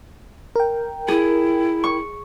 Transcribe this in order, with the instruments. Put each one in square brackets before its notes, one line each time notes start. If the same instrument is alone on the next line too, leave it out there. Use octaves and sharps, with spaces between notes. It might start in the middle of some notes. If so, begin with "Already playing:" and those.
[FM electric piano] A#4 G5
[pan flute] E4 [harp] G#4
[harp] C#6